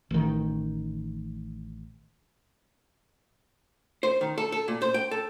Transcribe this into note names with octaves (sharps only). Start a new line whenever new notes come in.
A1 D#3
C5
D#3
A4
A4
A#2
C5
G5
A4